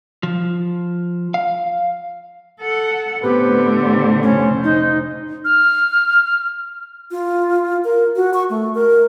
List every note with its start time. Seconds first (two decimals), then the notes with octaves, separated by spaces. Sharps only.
0.23 F3
1.34 F5
2.61 A4 F#5
3.23 A2 D3 B3 C4 G4 B4
3.63 C5
4.22 F1 C#4
4.63 D#4
5.45 F6
7.11 F4
7.84 A#4
8.16 F#4
8.34 C#6
8.50 A3
8.75 A#4